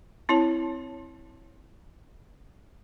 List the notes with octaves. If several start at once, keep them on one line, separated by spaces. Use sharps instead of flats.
C4 E4 C#5 A5